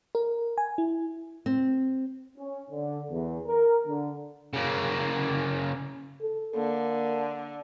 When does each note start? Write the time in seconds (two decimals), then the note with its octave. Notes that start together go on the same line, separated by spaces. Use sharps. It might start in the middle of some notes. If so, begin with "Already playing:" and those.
0.15 A#4
0.58 G#5
0.78 E4
1.46 C4
2.38 C#4
2.71 D3
3.12 E2
3.47 A#4
3.87 D3
4.53 C#3 A#3
6.21 A4
6.56 D3 A#3